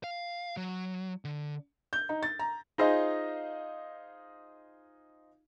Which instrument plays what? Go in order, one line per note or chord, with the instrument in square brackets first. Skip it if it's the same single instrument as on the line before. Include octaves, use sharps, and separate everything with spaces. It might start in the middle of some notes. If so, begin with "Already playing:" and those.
[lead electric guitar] F5
F#3
D3
[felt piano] G6
D#4
A6
A#5
[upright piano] D#4 F4 G#4 C5 D#5 F5